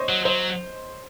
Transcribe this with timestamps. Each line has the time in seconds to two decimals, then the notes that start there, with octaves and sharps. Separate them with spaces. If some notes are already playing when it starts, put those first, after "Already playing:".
Already playing: C5 C#5 D#5
0.09 F#3
0.25 F#3 C5